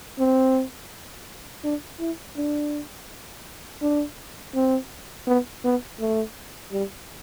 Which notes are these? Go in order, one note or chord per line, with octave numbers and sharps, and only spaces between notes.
C4
D4
E4
D4
D4
C4
B3
B3
A3
G3